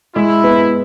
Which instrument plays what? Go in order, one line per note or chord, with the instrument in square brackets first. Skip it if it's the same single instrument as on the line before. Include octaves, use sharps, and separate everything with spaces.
[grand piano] G#3 [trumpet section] E4
[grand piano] B3